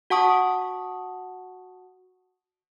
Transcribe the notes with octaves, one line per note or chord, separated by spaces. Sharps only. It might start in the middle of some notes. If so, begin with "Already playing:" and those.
F#4 F#5 A5 C#6 D#6